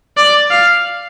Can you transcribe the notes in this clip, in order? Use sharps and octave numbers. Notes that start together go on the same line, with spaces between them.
D5
F5